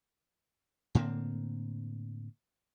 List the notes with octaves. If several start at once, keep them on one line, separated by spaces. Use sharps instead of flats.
A2 D3 A#3 C4